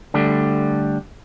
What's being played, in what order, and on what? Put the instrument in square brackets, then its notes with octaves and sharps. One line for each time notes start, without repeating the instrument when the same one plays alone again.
[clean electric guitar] D3 G3 A3